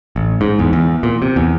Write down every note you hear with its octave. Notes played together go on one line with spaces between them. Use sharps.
A1
G#2
E2
E2
A#2
C3
E2